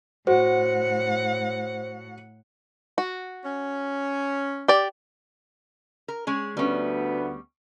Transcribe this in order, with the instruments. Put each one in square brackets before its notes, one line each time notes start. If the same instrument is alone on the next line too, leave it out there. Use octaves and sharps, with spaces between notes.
[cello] A2 F#5 [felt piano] F#4 [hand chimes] C5
[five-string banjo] F#4
[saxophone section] C#4
[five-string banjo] G4 D5
[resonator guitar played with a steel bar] A#4
G#3 C#4 G#4
[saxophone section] D2 B3 [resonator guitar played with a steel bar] G3 C#4